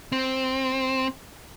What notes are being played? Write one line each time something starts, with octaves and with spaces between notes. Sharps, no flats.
C4